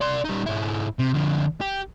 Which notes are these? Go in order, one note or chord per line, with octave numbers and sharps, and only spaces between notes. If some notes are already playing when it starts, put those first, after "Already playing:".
D5 C6
G3 D#4
G#2 E4
C3
D3 F3
G4